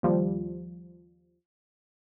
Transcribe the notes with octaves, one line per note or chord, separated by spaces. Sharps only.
D#2 F3 G3